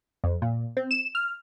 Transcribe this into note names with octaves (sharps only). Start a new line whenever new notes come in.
F2
A#2
C4
E7
F6